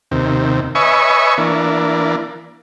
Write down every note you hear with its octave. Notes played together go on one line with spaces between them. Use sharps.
D#2 C3
B4 C#5 D#5 E5 G#5 C#6
E3 A#3 D4